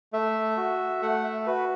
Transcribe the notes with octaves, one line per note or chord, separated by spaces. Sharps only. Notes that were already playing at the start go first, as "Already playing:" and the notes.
A3 E5
F#4
A3 F#5
E5
F#4 B4